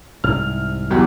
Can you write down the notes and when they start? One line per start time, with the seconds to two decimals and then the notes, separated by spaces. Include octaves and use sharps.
0.24 C2 G#2 C3 F6
0.90 E2 F#3 G4